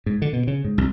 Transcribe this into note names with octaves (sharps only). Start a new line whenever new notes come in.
G#2
D3
B2
C#3
G#2
C2